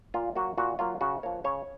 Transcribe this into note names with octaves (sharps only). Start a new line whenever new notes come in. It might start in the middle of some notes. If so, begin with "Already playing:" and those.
A#2 F4
F#3 A#3 F#4
A#2 F#4
F#3 A#3 F4
C#3 F#4
F3 A#3 C#5
C#3 C#5